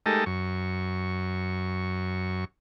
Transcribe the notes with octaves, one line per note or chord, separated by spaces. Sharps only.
G#3 A3 D#4 G4 A4 A#4
F#2 C#6